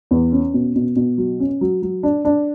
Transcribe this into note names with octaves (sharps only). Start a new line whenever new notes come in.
E2
C#4
B2
B2
B2
F#3
C#4
F#3
F#3
D4
D4